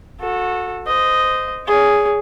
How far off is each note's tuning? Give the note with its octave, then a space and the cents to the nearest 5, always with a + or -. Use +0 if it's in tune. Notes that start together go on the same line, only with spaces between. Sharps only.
F#4 -25 A4 +0
C5 -20 D#5 +0
G#4 +0 C#5 +40